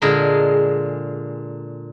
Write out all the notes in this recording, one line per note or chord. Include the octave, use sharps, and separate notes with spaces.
A#2 D3 G#3 G#4 A#4 B5